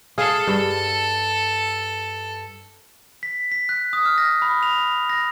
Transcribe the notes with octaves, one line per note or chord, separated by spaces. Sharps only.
G#4 A4 F5
G2
B6
B6
F#6
D#6
F6
A#6
B5
F7
A#6